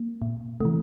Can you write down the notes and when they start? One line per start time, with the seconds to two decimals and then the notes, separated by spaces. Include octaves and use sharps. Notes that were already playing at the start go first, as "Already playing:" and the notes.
Already playing: A#3
0.22 A#2
0.60 C3 E3 A3